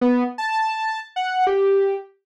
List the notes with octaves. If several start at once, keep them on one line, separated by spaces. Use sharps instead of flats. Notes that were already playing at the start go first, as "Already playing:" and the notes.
B3
A5
F#5
G4